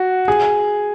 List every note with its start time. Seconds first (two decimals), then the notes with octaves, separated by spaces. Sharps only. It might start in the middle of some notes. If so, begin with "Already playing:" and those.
Already playing: F#4
0.28 G#4